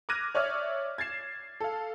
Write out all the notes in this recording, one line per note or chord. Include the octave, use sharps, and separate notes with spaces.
D6 F6 F#6 G#6 A#6 D#7
C#5 D5 E5 F6
G#6 A6 C7 E7
A4 F5